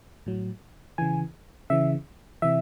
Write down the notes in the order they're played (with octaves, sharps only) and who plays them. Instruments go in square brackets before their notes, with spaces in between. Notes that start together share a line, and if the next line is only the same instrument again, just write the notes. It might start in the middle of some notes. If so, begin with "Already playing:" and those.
[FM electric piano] A2 F#3
C#3 E3 G#5
C#3 E3 E5
C3 E3 E5